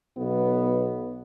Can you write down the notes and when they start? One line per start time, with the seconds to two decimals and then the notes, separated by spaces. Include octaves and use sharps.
0.17 B1 B3